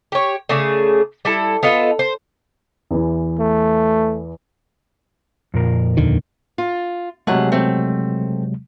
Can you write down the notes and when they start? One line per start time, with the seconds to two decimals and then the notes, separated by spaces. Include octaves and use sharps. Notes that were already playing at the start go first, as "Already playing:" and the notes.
0.12 G4 C#5
0.49 C#3 A3 G#4 D5
1.25 G3 E4 A4
1.63 B3 F4 A4 D#5
1.99 C5
2.91 E2 E3
3.39 A3
5.54 F2 A#2 A#4
5.97 D#2 D3 D#3
6.58 F4
7.27 C3 F#3 G#3 A3 G#4 F#5
7.52 A3 C4